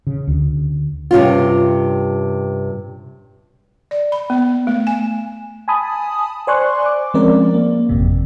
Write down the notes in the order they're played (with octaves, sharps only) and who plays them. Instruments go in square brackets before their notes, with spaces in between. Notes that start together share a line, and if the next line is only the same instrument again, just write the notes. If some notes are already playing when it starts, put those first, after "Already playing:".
[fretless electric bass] C#3
D2
[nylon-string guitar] G2 C3 C#4 F4
[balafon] D5
B5
B3
A3
G#5
[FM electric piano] G#5 A5 B5 D#6
C5 D5 G#5 C6 C#6 F#6
D6
F3 G#3 C4 C#4 A#4 D5
A#3
G#1 F2 C3